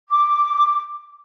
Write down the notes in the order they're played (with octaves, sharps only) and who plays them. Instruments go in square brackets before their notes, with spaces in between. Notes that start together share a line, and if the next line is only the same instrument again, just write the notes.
[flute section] D6